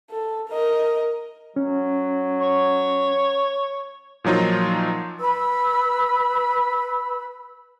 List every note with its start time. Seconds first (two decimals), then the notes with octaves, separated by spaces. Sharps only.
0.10 A4
0.48 A#4 D#5
1.56 F#3 C#4
2.41 C#5
4.24 A#2 F3 F#3 D#4 F4
5.20 B4 B5 E6